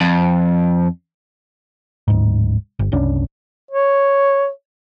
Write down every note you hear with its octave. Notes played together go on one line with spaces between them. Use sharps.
F2
D1 G#2
G1
F#1 C2 C#4 D4
C#5